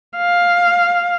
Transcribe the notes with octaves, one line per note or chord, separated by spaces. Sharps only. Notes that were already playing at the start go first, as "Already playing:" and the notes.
F5